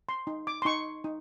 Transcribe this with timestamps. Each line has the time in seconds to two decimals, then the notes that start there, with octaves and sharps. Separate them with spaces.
0.09 C6
0.27 D#4
0.47 D6
0.62 C6
0.65 D#4 C#6
1.04 D#4